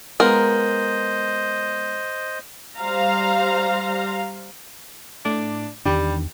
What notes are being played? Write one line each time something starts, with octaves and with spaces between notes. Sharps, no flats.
G#3 B3 F4 A#4 C5 D#5
G3 C5 F5 A#5
A2 A3 D4 D6
E2 D#3 E3 G3 D4 G4